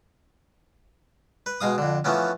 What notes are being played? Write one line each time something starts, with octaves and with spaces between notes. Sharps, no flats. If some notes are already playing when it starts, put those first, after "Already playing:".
B4
B2 G#3 F5 D#6
F2 D3
E3 F3 A3 B3 C#4